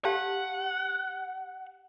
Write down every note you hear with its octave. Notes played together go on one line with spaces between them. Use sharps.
G4 F5 F#5 A5